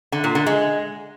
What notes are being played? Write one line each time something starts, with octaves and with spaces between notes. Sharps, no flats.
D3
A#2
D3
G#3